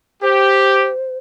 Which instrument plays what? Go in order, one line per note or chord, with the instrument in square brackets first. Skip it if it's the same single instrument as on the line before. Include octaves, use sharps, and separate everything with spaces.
[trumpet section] G4 [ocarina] C5